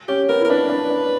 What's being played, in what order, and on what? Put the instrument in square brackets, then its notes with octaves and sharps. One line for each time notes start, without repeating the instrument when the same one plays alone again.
[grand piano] C#4 [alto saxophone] G4
[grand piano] B3 [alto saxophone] A#4
[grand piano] E4
[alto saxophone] A#4
[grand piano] D4 [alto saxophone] B4
[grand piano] D4
D4